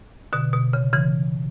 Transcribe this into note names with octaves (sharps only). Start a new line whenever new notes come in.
B2 D3
B2
C#3
C#3 E3